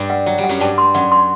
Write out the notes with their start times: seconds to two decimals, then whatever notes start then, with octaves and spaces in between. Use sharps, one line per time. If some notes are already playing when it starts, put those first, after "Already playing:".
Already playing: G2 G3
0.10 F#5
0.26 F#3 F#5
0.38 G3
0.44 F#5
0.49 F#2 F#3
0.60 G2 G3 A5
0.78 C6
0.94 F#2 F#3 F#5
1.12 C6